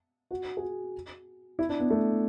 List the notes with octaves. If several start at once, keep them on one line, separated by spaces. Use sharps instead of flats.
F#4
G#4
F#4
E4
D4
B3
A3